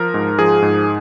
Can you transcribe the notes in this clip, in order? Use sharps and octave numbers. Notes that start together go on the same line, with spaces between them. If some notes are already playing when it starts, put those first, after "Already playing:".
Already playing: F3 A#4
G#2
F3 G#4
G#2